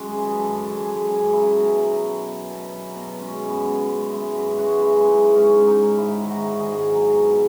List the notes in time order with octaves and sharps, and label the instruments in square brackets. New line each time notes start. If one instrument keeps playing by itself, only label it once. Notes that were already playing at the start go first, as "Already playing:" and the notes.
Already playing: [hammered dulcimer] F#2 G#3
G#4
E3
F#2 A4
E3
G#4
G#3
G#4
F#2
F#3 E4
B2
F#3
B2
B2
B2
F#3
B2
G#3 C#4
F#2
B3
F#2
G#3
G#3 E4
F#2 F#4
G#4
G#3 F#4
F#2 E4
G#3 D#4
G#2
C#4
G#2
D#4
G#2
G#2 E4
D#3
F#4
D#3
G#4
G#2
F#3
B2